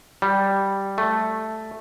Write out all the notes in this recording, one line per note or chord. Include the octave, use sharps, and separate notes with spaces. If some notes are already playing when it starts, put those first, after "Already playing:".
G3
A3